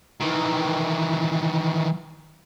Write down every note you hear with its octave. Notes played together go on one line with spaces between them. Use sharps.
D#3 E3